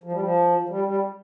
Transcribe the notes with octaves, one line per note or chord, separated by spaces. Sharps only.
F3
G3
F3
F3
G3
G3